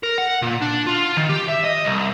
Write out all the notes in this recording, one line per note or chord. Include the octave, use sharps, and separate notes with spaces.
A#4
F#5
A#2
D4
F4
D#3
G4
E5
D#5
C2